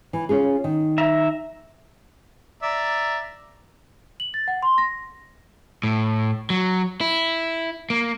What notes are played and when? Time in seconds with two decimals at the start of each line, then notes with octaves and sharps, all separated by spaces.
0.13 E3
0.29 C#4 F4 G#4
0.64 D#3
0.98 E5 A#5
2.62 D5 E5 A#5
4.20 F#7
4.34 A6
4.48 F#5
4.63 C6
4.78 A#6
5.83 A2
6.50 F#3
7.01 E4
7.90 A#3